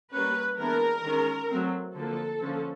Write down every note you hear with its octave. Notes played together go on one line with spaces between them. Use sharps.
G3 A#3 C#4 B4
E3 G#3 B3 D4 A#4
D#3 G#3 C#4
F#3 A3 C4
D3 F3 A#3 A4
D3 F3 A#3 C#4